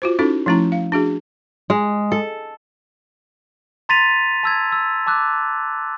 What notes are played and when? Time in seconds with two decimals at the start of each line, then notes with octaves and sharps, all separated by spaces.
0.02 F4 F#4 C5
0.19 C#4 D#4 E4 F#4 A4
0.46 F3 A3 C#4 E4 A#5
0.72 F5
0.92 D4 F#4 G#4
1.70 G#3
2.12 A4
3.89 A#5 C6 A6 B6 D#7 F7
4.43 A5 E6 G#6
4.72 E6
5.07 A5 D6 E6 F#6